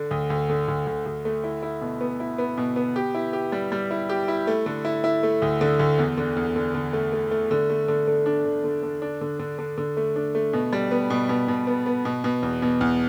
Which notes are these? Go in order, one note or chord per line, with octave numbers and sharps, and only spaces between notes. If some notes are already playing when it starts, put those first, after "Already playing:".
Already playing: D3
D2
D2
D3
D2
D2
D2
A3
E4
E4
B2
B3
E4
B3
B2
B3
G4
E4
G4
G3
G3
E4
G4
E4
A3
D3
E4
E4
A3
D2
D3
D2
E2
D3
E2
D3
D3
A3
A3
A3
D3
A3
D3
D3
D4
D3
D3
D3
D4
D3
D3
D3
D3
A3
D4
A3
B2
G3
B3
B2
B2
B2
B3
B3
B2
B2
E2
B2
E2